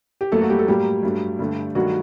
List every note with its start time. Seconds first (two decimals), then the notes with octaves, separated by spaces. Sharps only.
0.21 G4
0.32 F#2 F#3 A3 A#3 A4
0.41 F#4
0.50 G3 G4
0.59 A4
0.67 A2 F#3 G3 A#3 G4
1.03 G2 F#3 A3
1.39 G2 D3 A3
1.75 G2 D#3 F#3 A3 F#4